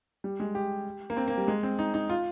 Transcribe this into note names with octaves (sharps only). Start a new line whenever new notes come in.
G3
G#3
G4
A#3
C4
A#3
G3
G#3
C4
D#4
D#4
F4